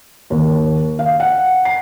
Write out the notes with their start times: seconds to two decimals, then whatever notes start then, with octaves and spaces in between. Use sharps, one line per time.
0.30 D#2
0.99 F5
1.20 F#5
1.65 C7